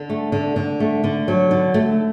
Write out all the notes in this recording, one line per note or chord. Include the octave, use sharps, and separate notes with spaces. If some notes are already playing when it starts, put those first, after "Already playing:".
Already playing: D3
A3
D3
D3
A3
D3
F#3
D3
A3